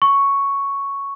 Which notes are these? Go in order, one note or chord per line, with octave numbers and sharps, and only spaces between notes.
C#6